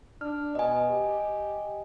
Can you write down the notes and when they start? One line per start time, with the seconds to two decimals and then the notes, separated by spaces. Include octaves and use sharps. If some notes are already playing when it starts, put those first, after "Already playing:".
0.21 D4 F6
0.55 B2 D#5 G#5
0.91 G4